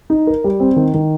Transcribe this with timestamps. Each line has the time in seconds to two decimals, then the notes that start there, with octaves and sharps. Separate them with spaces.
0.10 D#4
0.27 A#4
0.44 G3
0.60 C4
0.76 D#3
0.94 D#3